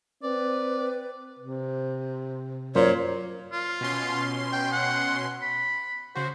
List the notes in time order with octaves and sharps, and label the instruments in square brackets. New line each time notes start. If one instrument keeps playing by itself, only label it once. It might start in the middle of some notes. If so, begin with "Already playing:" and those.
[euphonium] C4 [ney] B4 [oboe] D5
[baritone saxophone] C3
[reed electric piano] F#2 C5 [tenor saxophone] A#2 [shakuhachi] C#5
[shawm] F4
[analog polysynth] B2 C#4 C6
[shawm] G5
F#5
B5
[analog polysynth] C#3 F#4 [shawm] C5